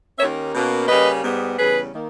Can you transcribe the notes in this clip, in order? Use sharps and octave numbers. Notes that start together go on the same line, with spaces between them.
D#2 D#3 A#3 C#4 C#5 E5
B2 A#3 C#4
C#3 G3 A#3 C#4 B4 D#5
G#2 G3 B3
E2 C#3 G3 C#4 G#4 B4
D#3 A#3